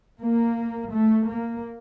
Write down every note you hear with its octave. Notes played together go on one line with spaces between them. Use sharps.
A#3
A3
A#3